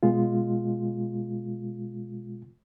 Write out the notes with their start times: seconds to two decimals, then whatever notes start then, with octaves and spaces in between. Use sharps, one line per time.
0.03 B2 G#3 F4